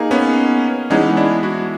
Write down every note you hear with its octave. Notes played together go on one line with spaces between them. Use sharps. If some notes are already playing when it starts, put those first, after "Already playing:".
Already playing: A#3 D#4 G#4
B3 C#4
E3 G#3 B3 C#4 D#4
D4 E4
E4 F#4